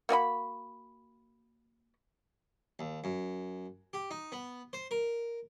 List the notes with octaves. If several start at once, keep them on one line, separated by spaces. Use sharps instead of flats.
A#3 F#4 D#5 B5
D#2
F#2
G4
D#4
B3
C5
A#4